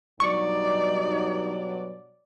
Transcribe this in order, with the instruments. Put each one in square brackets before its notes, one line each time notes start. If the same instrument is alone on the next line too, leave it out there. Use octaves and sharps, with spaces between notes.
[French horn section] G2 B2 F#3 [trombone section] G3 D#4 [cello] D5 [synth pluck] C#6